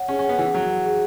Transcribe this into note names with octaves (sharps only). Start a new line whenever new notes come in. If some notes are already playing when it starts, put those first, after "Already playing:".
Already playing: C#5 F#5
C#4 G#4
C#4
F#5
B3
E3 G#4
F#3 F#5
F#5
G#4